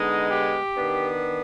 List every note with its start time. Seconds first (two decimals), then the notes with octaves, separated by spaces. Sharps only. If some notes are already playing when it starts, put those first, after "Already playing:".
Already playing: D3 G#3 B3 D#4
0.30 G4
0.75 D#3 B3 D4